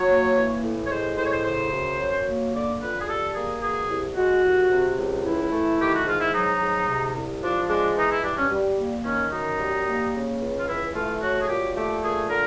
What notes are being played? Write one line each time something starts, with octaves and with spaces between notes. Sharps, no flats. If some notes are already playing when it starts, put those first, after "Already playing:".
Already playing: F#3 C#5
A#3
E3
A2
C#5
G#3 C5
A2 C5
C#5
C5
C#3 C5
F#2
F#3
A#3
D3 D5
F2 B4
G#4
G3 A4
A#3 G#4
B2 G#4
C2
G#3 F#4
C2
C3
C#2
E3 E4
A3
D#3 G4
F#4
G#2 F4
E4
F#3 D#4
G#2
C3
C2
F3 D4
G#3 D4
E3 D#4
E4
G2 D4
C#4
G3
A#3
D#3 C#4
F#2 D#4
G3
A#3
C#3
C#2
F4
E3 E4
A3 F4
F#3 F#4
G#4
A#2 G4
A3 G4
A#2 G#4
D3 A#4